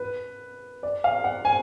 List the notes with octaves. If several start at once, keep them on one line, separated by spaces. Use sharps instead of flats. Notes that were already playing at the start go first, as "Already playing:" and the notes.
Already playing: B4
D5
F5
F#5
G#5